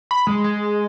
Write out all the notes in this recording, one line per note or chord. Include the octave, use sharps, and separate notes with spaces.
B5
G#3
G#3